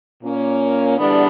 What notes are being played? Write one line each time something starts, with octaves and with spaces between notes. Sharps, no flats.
A#2 A#3 C#4
E2 D3 G3 B3 D4